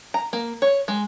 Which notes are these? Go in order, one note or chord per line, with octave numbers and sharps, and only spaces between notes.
A#5
A#3
C#5
G#3